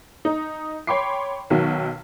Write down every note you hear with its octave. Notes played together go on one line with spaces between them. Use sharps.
D#4
C#5 G5 B5 C6 D6 C7
B1 D#3 F#3 F#4